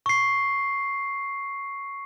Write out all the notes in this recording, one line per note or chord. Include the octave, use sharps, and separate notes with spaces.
C#6 C7